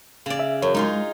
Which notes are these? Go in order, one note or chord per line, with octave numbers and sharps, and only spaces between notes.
C#3 D5
E5
F#2 C#5
G#3 D#4 F4 G#4